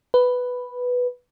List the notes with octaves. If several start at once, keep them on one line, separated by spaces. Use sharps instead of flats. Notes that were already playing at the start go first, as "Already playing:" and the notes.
B4